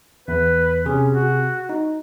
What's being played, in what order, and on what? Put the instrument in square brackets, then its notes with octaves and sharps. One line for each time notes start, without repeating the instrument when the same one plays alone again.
[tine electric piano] E2 [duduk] B4
[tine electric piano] C3 G#4 [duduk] C#4
[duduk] F#4
[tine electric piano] D#4